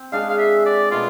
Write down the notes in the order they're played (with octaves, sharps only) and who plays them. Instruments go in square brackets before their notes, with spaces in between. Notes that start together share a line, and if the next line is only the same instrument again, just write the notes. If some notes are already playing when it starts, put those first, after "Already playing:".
Already playing: [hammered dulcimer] C4
[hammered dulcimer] G#3 D4 G#4 [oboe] F5
[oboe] F5
E5
D5
[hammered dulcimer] B2 A3 [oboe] F4